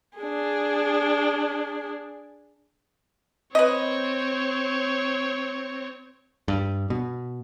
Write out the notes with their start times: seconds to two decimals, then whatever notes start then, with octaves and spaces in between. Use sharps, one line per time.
0.18 D4 G#4
3.55 C4 B4 C#5 D#5
6.48 G2
6.90 B2